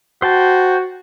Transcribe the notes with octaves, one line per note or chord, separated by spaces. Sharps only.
F#4 C5 G5 A5